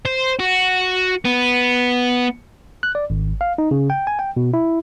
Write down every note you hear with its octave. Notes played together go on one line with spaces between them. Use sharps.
C5
F#4
B3
F#6
D5
G#1
F5
D#4
C#3
G5
G#5
G5
B2
E4